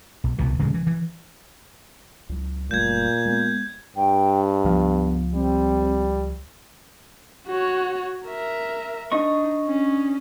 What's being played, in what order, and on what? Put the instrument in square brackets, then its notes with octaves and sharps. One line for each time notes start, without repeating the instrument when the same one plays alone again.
[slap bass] B1
C2 B2 E3
D1 C#3 E3 G#3
E3
E3
[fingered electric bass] C#2 F#3
[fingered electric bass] F#1 G3 A3 [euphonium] A#2 [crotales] G6 G#6
[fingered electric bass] G#3 B3
[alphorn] G2 [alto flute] G5
[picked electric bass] C#2 F3 [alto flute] B3
[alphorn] G3 [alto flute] C4
[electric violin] F#4 C#5
A#4 E5
[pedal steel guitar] D4 D#5 C#6 [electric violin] D#4
[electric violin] C#4